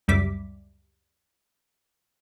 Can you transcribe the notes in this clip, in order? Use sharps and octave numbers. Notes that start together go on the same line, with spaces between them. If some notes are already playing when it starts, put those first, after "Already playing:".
C#2 F#2 G3 E5 D6 B6